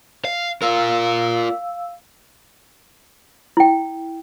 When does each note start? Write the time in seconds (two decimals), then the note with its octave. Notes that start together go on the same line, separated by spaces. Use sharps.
0.25 F5
0.62 F4 A#4 F5 E6
3.57 E4 G5